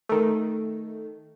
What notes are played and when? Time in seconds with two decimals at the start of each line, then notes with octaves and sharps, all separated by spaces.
0.09 D#3 A3